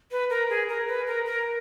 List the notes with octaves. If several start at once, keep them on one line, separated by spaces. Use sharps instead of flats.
B4
A#4
G#4
A#4
B4
A#4
A#4